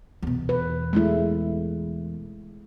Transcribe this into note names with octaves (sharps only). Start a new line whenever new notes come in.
E2 B2
B4
G#3 A3 E4